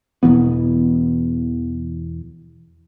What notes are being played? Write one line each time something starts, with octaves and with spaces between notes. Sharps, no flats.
E2 B2 E3 B3